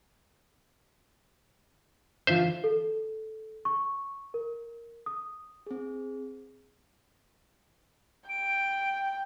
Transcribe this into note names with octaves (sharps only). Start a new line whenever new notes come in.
D3 E3 F4 C5 E5
A4
C#6
A#4
D#6
C4 G#4
G5 D7